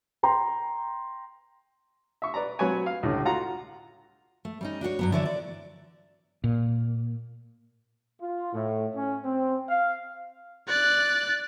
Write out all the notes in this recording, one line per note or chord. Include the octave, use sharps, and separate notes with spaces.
G5 A#5 C6
E5 C#6
B4 D5 A#5
F#3 C4 B4 C#5 G#5
F5
C#2 A2 D3 G3
F4 F#4 F#5 A#5
A3
G3 C#4 D#4
D4 F#4 G4 C#5
G2 F#3 B3
D3 E3 E4 C#5 D5
D5
A#2
F4
A2
C#4
C4
F5
D5 F#6